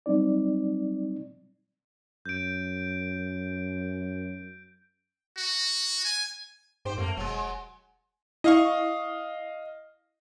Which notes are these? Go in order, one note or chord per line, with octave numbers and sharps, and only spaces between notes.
F#3 G3 C4 D#4 D5
F#2 G6 D7
F#4
G#5
G#2 G4 C5
F#2 A3 A#3
E1 F#3 G#3
E4 D#5 F5 C#6